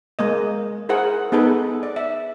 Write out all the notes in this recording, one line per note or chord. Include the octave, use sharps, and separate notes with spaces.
G#3 A#3 D#5
E4 G#4 A#4 C5 F#5
B3 D#4 G#4 A4 B4
D5
E5